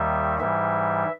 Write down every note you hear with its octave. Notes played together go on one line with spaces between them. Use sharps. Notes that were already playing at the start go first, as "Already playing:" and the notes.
Already playing: D#2 D#3 G3 E5
G#2 E3 G3 E5